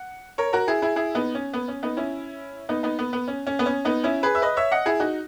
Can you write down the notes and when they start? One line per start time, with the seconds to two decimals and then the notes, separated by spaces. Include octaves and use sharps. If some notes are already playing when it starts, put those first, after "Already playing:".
Already playing: F#5
0.38 A#4 C#5
0.53 F#4 A#4
0.68 E4 G#4
0.82 E4 G#4
0.96 E4 G#4
1.15 B3 D#4
1.35 C#4
1.53 B3
1.68 C#4
1.83 B3 D#4
1.97 C#4 E4
2.69 B3 D#4
2.83 B3 D#4
2.99 B3
3.13 B3
3.28 C#4
3.47 C#4
3.59 B3
3.66 C#4
3.85 B3 D#4
4.04 C#4 E4
4.23 G#4 B4
4.35 E5
4.42 B4 D#5
4.57 C#5 E5
4.72 D#5 F#5
4.86 E4 G#4
5.00 D#4 F#4